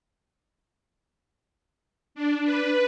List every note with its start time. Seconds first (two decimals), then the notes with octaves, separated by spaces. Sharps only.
2.15 D4
2.44 B4